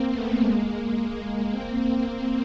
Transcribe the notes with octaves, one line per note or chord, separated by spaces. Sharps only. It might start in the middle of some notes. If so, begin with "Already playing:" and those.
Already playing: A#3 C4
A3 B3
G#3 A#3
G#3 A#3
A#3 C4
A#3 C4